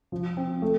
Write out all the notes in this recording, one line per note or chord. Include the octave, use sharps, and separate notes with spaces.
F3
C4
A3